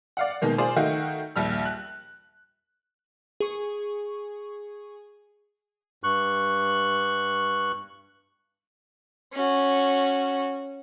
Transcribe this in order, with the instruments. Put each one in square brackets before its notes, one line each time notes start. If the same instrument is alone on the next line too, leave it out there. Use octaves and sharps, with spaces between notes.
[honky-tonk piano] D5 F5 F#5
B2 D#3 G#3 A#3
F4 G#4 C5 D5
D#3 A3 D#4 F#4 F5 G5
A#1 D#2 G3 F6
F#6
[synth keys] G#4 C#6
[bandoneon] G2 C#6 F#6
[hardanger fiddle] C#4 F#4